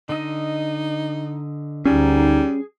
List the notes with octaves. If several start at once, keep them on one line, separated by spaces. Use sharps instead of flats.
D3 D#4 D#5
D2 D3 G3 C#4 D#4 G#4